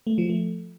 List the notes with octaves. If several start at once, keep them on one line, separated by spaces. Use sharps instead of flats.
A3
F3
A3